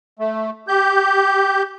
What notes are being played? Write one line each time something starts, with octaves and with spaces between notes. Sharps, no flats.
A3
G4 G6